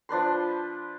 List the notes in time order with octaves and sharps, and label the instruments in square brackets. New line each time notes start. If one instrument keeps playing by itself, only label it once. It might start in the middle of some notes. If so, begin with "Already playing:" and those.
[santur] F3 D4 B4 C6